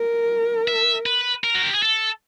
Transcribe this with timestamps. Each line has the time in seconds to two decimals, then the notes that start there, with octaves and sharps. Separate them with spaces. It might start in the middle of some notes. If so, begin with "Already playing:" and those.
Already playing: A#4
0.68 E5
1.06 B4
1.44 A#4
1.55 F#4
1.64 G4
1.73 G#4
1.83 A4